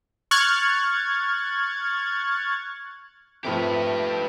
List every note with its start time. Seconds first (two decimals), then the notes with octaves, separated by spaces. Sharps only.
0.31 C#6 F6 F#6 G#6 A6
3.45 C3 F3 A3 G4 B4